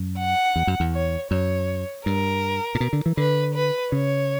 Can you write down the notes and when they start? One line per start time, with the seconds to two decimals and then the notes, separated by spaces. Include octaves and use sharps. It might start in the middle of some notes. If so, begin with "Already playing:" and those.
Already playing: F#2
0.18 F#5
0.56 E2
0.67 F#2
0.80 E2
0.93 C#5
1.30 F#2 C#5
2.06 G2 A#4
2.75 A#2
2.80 B2
2.93 D3
3.06 E3
3.17 D3 B4
3.55 B4
3.92 C#3 C#5